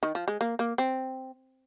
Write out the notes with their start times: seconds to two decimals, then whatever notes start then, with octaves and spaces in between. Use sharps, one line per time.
0.03 D#3
0.15 F3
0.28 G#3
0.41 A#3
0.59 A#3
0.78 C4